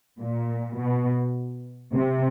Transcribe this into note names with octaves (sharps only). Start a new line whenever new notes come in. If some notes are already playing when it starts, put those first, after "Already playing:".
A#2
B2
C3